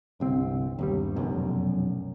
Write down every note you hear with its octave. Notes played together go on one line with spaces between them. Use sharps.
G1 C2 C4
G1 D#2 G3
F1 B1 F#2